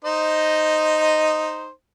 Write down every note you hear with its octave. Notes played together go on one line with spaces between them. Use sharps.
D#4 C5 D#5